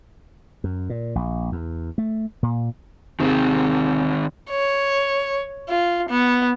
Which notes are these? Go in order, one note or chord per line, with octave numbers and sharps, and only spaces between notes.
F#2
A#2
A#1
E2
A3
A#2
D#2 C3 D#3 C4 G#4
C#5
F4
B3